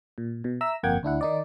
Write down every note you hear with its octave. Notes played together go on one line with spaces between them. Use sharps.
A#2
B2
E5 A#5 E6
G1 F2 A#3 F#5 G5 G#6
D2 D4 E4 F#5
D#3 D#4 D5